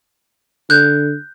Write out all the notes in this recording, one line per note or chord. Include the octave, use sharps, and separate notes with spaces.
D3 F#6 G6